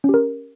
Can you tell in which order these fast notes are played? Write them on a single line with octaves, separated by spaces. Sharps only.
C#4 G4 A#4